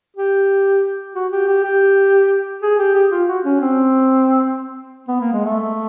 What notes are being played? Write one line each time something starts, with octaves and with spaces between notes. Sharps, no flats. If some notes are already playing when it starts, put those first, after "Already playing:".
G4
F#4
G4
G4
G4
G#4
G4
G4
F4
F#4
C#4
C4
B3
A#3
G#3
A3